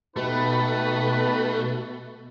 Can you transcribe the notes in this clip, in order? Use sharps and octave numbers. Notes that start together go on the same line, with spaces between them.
B2 A3 D#4 G4 B4